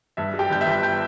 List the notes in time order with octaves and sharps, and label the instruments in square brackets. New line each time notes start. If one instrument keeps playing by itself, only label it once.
[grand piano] G2 E5
G3
G4 G5
G1 G6
E5 E6
G1
G5 G6